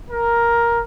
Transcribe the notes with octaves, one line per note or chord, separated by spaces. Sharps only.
A#4